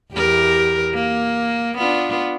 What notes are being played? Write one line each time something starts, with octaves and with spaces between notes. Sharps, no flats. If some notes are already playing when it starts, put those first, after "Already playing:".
E2 G4 A#4
A#3
B3 D4 F4